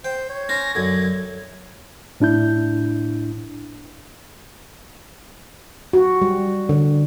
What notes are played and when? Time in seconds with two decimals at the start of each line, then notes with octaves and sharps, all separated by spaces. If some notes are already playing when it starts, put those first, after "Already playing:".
0.04 C5 G5
0.30 C#5
0.49 C#4 C5 A#6
0.75 F#2 D3 G#6
2.20 A2 D4 E4 G6
5.93 F#4
6.22 G3
6.69 D3